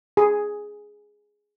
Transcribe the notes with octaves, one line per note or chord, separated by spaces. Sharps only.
G#4